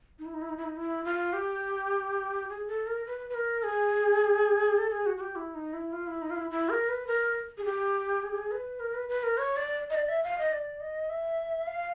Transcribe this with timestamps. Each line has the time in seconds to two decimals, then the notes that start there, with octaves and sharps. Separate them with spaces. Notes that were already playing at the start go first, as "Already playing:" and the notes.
0.19 D#4
0.26 E4
0.34 D#4
0.42 E4
0.49 D#4
0.57 E4
0.64 D#4
0.76 E4
1.05 F4
1.33 G4
2.49 G#4
2.67 A4
2.87 A#4
3.06 B4
3.30 B4
3.34 A#4
3.63 G#4
4.78 A4
4.92 G#4
5.06 F#4
5.17 F#4
5.21 G4
5.36 E4
5.55 D#4
5.73 E4
5.93 F4
6.07 E4
6.22 D#4
6.30 F4
6.36 E4
6.51 E4
6.70 A#4
6.89 B4
7.07 A#4
7.58 G#4
7.65 G4
8.23 G#4
8.31 G4
8.38 G#4
8.51 B4
8.80 A#4
8.94 B4
9.09 B4
9.23 A#4
9.38 C#5
9.57 D5
9.90 D#5
9.95 D5
10.09 E5
10.24 F5
10.38 D#5
10.52 D5
10.80 D#5
11.10 E5
11.67 F5